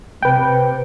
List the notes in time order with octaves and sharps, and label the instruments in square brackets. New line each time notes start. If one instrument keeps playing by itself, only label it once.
[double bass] C3 [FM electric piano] B4 G5